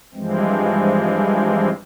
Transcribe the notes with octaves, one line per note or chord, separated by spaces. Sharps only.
G2 E3 F3 G#3 C4